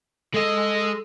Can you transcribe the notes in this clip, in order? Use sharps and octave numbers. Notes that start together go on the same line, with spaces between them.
G#3 A4 D#5